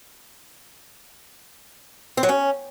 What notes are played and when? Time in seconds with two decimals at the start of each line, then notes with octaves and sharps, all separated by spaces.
2.17 C4
2.23 F#3
2.29 C#4